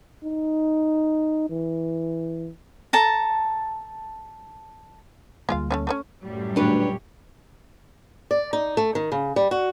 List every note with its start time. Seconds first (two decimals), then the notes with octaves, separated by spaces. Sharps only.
0.24 D#4
1.50 E3
2.93 A4 A5 A#5
5.49 D2 G3 G#3 A#3 F4 F5
5.71 A3 B3 C#4
5.87 A3 B3 C#4
6.24 F#2 A2 G3
6.56 D2 A#2 D4 G4 B4 C#5
8.31 D5
8.53 D#4
8.77 A3
8.95 D#3
9.12 C#3
9.36 G3
9.51 F#4